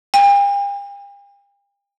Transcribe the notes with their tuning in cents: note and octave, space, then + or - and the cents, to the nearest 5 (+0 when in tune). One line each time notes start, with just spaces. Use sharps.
G5 +45